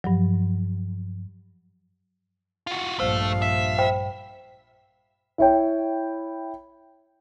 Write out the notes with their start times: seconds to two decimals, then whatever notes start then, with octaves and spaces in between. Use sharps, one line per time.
0.04 G2 F3 F#3
2.67 F4 F#4
3.00 A#1 G2 F3 A3 C5 F5
3.42 E5
3.78 C5 G5 B5
5.38 E4 C#5 G5